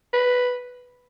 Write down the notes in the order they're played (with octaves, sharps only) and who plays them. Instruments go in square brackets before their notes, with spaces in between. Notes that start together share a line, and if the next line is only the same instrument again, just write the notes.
[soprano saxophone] B4